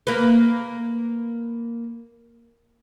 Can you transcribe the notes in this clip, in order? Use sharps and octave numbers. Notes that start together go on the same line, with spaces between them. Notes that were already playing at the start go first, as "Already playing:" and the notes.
A#3 B4